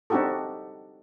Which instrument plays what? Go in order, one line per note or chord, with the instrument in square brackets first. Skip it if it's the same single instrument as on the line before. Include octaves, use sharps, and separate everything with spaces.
[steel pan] C4 D4 D#4 F#4 G4 A4